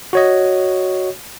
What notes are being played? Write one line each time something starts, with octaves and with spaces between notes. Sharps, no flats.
F#4 C#5 D#5